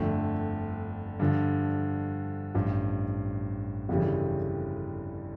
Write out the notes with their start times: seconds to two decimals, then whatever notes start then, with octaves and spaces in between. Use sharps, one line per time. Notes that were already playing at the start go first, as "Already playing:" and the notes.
Already playing: G1 F2 D3 A3
1.19 G2 D3 F3
2.54 A1 G2 F3
3.89 G1 F2 C#3 E3 G3